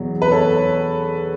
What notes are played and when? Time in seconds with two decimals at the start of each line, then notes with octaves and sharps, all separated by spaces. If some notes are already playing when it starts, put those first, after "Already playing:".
Already playing: E2 B2 F#3
0.22 B4
0.31 A4 C#5